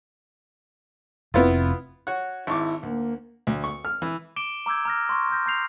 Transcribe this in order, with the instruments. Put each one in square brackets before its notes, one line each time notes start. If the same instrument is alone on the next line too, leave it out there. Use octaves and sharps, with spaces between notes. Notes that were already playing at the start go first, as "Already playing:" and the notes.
[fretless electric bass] F1 B2 C4 [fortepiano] B3 E4 F4
[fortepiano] F#4 C#5 F#5
[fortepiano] G#1 C#6 D6 [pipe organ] E4
[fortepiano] D2 [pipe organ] A#3
[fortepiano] D2
C#6
F6
E3
[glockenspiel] D6 D7 E7 G7
A#5 D6 E6 G6 G#6
A#5 F6 A#6
C6 C#6
C#6 F6 G6 A#6
A#5 G6 C7 F7